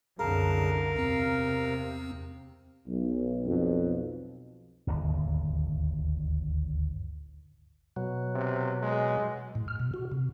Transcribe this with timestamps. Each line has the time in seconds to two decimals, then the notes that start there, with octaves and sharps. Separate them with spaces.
0.19 C2 F#2 D3 G#4 A#4 F5 A5 A#5
0.96 E2 C3 C4
2.87 B1
3.46 F2
4.87 D1 G1 D#2
7.96 B2 F#3
8.35 C3
8.82 G#3
9.55 A2
9.68 F6
9.80 B2
9.94 F#4
10.12 C3